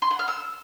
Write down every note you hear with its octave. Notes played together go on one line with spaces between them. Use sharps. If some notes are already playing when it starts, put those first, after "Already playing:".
C6
F#5
F6
E6